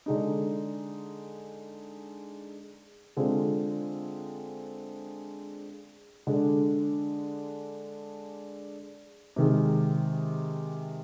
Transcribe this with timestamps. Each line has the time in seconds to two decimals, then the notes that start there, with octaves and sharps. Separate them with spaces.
0.06 D3 G#3 D#4
3.17 D3 G#3 C4 F4
6.27 D3 G#3 D4
9.36 C3 D#3 G#3